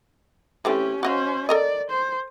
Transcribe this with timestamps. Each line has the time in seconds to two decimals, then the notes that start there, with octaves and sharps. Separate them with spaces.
0.65 E3 A3 C4 C#4 G4
1.03 C#4 F#4 C5 D#5 F5
1.49 A4 A#4 D5 D#5
1.91 C5